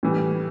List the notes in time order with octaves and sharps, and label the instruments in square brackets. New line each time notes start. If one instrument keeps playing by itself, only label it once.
[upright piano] A2 E3 G3